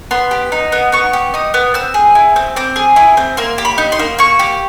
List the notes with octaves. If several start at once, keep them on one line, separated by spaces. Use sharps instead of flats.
B3 C6
G4
D#4
B3
B3 C#6
G4
D#4 D#6
B3
C4 E6
G#4
E4
C4
C4 D6
G#4
E4
C4
A#3 C6
G4
B5
D#4
C6
A#3
A#3 C#6
G4